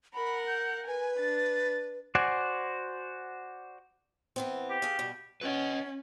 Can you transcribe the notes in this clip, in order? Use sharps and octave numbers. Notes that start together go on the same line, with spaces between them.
A#4 F#5 B5
G6
B4 G#5
D4 A6
F#4 C5 D5 F#5 G#5
E3 B3 C4
G4
G#4 F5
B2 G3
C#4 B4 D#5